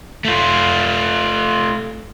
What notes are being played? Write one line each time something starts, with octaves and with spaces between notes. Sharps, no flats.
A3 F4